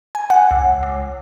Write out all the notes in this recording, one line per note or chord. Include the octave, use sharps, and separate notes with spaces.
G#5
F#5
C#2
C#2